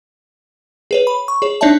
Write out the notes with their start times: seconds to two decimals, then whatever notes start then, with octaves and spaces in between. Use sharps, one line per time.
0.91 G#4 B4 C#5
1.07 B5
1.28 C#6
1.42 G#4 C#5
1.61 D4 D#4 C#5 D5 E5 A5